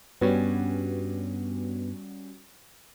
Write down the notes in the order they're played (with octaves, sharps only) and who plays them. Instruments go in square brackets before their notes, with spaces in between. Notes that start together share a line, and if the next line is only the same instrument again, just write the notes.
[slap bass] G2 [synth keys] G3 C#4 F#4 [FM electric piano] B3